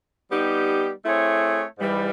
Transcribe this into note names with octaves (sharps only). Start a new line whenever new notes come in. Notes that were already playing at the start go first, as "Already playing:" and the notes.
G3 B3 D#4 G4
A3 C4 E4 G#4 C#5
G#2 E3 G3